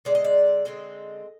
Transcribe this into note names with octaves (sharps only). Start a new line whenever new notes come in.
D3 G#3 C4 D5
D#5
D5
D3 G#3 C4 D#5